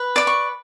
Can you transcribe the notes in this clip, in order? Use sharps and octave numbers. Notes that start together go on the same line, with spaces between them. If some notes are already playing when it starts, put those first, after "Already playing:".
Already playing: B4
D5 D6
C#6